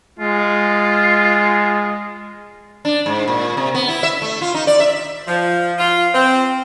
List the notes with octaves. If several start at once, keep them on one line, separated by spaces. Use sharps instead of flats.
G#3 F4
D4
G#2
A#2
C3
B3
E4
E5
A3
F4
D#4
D5
E5
F3
F4
C4